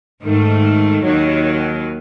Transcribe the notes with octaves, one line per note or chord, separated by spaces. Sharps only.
G#2 D#3 A3
D#2 D#3 F#3